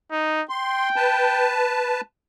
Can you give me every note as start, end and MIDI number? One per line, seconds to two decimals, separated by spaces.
0.11 0.42 63
0.49 1.58 79
0.49 0.89 84
0.96 2.01 71
0.96 2.01 81